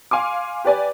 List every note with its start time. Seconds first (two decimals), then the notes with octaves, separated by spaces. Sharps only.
0.11 F5 G#5 C6 D6
0.65 G4 B4 D5 G#5